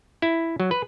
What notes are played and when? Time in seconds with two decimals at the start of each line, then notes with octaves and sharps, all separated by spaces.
0.22 E4
0.60 F#3
0.71 B4